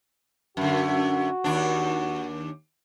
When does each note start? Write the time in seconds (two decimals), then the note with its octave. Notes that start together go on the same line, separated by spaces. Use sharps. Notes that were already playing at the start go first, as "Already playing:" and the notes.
0.57 F#2 D3 F#4
1.44 D#2 D4